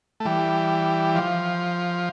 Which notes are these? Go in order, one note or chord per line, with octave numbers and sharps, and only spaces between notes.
A3
E3 G3
F3